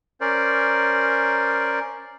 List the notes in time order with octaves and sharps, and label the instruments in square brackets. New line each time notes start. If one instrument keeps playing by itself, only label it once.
[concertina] C#4 A#4 C5 D5